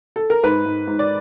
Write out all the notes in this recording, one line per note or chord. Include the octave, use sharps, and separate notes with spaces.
A4
A#4
G#2 B4
G#2
G#2
D5